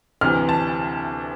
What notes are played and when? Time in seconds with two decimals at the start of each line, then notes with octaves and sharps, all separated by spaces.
0.21 D2 C3 E3 F6
0.49 A5